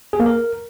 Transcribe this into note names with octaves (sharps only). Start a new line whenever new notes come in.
G#4
A#3
A#4